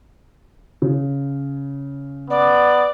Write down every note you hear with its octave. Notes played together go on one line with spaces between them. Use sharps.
C#3
B3 D5